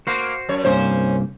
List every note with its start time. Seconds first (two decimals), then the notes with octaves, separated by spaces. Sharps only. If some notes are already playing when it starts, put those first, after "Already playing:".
0.07 A#3 F#4 C5
0.49 F#2 C#5
0.65 C2 G2 A#3 C#4 C5